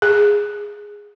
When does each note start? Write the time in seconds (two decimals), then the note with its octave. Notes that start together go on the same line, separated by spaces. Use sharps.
0.02 G#4